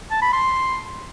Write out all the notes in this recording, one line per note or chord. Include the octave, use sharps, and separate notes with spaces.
A5
B5
C6